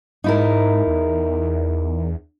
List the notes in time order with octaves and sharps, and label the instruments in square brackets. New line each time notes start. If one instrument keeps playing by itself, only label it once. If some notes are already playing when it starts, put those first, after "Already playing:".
[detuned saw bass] G#2 [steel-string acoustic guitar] D#4 E4 A#4
[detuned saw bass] E2